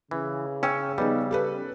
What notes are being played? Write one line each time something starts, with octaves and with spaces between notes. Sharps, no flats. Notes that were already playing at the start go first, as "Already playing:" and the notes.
C#3 E3
C#4 G5 C#6 E6
G3 B3 D#4 G#4
G4 A4 B4